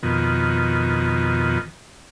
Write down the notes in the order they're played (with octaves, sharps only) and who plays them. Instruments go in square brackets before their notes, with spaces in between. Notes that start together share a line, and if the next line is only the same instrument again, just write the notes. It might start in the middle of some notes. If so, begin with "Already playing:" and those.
[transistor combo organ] F2 B2 D#3